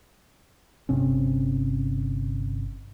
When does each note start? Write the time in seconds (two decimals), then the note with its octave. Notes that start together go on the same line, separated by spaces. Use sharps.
0.89 G1 C3 C4 C#4